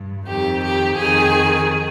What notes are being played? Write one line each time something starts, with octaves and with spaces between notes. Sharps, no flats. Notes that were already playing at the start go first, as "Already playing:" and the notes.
Already playing: G2
F2 D#3 G4
G4
F2 D#3 G#4